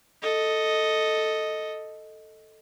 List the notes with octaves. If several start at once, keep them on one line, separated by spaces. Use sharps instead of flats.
A4 D#5